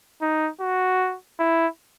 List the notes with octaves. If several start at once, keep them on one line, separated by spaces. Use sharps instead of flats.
D#4
F#4
E4